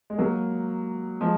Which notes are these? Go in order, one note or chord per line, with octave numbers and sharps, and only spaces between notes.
G#3
F#3 A#3
F3 G#3